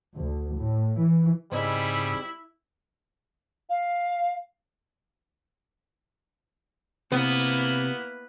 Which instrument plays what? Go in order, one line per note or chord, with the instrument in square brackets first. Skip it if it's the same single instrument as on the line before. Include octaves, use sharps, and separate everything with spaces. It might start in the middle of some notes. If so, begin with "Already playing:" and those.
[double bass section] D2
A2
E3
[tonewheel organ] G#2 C#3 [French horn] G3 [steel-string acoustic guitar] C4 D#4 G#4 [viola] E4 E5
[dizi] F5
[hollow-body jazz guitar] C3 [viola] A#3 E4 [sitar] B3